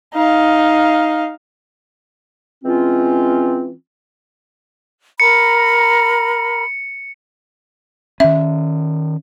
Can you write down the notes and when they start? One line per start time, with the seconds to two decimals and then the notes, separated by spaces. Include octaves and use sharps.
0.14 D#4 F5
2.64 E3 G#3 C4 C#4 F4
5.20 A#4 A#5 B5 C#7
8.20 D#3 C#4 E5